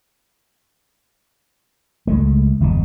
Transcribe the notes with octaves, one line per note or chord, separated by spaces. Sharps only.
C#2 G#3 A3
G1 E2 B2